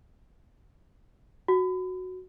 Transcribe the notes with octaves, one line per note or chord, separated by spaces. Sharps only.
F#4